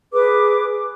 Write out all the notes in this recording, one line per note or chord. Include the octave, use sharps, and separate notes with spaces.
G#4 B4 D6